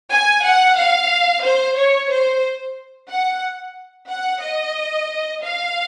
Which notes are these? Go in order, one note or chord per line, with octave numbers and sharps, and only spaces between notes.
G#5
F#5
F5
C5
C#5
C5
F#5
F#5
D#5
F5